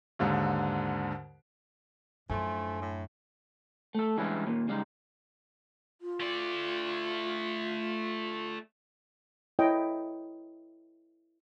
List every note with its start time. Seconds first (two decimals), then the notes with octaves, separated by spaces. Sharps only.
0.19 D#2 G#2 D3
2.30 F#2 A2 F3 A3 D4 G#5 C6
2.81 A2
3.95 A3 A4
4.18 E3 G3 G#3 C#4 D4 E4
4.46 D#2 A#2
4.68 C#3 G3 G#3 D#4
6.01 F4
6.20 A3 D5
9.59 E4 A4 C#5 D#5 G5